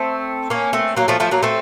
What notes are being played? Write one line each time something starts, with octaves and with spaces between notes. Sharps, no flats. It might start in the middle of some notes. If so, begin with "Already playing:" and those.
Already playing: A3 C4
A#3 C#4
A3 C4
F#3 A#3
F3 A3
F3 A3
F#3 A#3
A3 C4